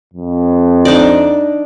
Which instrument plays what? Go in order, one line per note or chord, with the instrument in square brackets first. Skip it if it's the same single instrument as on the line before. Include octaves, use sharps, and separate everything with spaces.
[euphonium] F2
[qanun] D4 D#4 D5